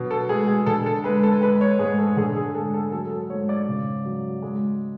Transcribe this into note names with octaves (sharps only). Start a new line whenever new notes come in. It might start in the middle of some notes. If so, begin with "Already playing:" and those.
Already playing: B2 D3 F#3
A4
G#3 G#4
G#4
D3 A4
A4
G#3 B4
A4
G#3 B4
C#5
G#2 G#4
A4
D3 G#4
G#4
G#3 A4
A4
F#3 A4
A4
G#2 C#5
D5
C#3
F#3
G#3